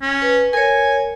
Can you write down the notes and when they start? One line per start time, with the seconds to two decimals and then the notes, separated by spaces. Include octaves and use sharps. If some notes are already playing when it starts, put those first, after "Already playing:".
0.02 C#4
0.22 B4
0.53 A#4 C#5 G#5